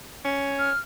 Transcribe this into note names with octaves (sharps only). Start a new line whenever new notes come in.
C#4
F6